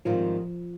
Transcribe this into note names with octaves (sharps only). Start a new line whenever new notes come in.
G#2 D#3 F3 G3 C4 F4